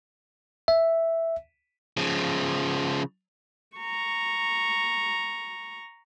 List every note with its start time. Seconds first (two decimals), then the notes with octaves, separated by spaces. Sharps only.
0.68 E5
1.97 C#3 F3
3.77 A#5 C#6